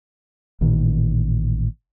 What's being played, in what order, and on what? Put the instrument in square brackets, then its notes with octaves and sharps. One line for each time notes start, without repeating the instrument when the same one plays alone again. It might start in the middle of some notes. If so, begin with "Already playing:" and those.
[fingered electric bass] A1 A#2 D#3